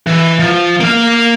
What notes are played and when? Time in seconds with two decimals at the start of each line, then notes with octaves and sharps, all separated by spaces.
0.07 E3
0.40 F3
0.81 A#3 F5